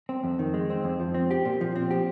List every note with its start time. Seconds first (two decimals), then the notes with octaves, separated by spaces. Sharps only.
0.09 C4
0.24 F2
0.39 D#3
0.54 G#3
0.70 C4
0.84 F2
1.00 F3
1.14 C4
1.31 G4
1.45 A#2
1.61 F3
1.76 C4
1.91 G4